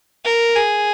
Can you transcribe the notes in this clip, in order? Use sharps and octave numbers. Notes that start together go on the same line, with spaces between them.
A#4
G#4